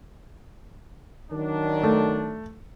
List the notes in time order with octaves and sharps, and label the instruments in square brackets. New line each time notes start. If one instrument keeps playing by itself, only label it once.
[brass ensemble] D#3 F#3 D4
[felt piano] A3